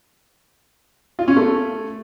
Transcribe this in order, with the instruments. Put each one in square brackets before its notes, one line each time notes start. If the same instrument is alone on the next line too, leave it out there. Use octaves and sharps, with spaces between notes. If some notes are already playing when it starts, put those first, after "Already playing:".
[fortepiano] F4
C#4
A3